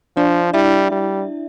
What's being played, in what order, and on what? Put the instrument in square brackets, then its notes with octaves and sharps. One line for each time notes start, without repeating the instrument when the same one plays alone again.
[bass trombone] F3 [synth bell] D4 D5
[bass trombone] G3 [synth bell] E4 E5
[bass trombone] G3